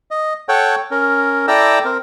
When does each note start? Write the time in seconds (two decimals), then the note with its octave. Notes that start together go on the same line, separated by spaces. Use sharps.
0.11 D#5
0.49 A4 C#5 F#5 G5
0.91 C#4 A#4
1.48 E4 A4 D5 G5 A#5 E6
1.85 C4 A#4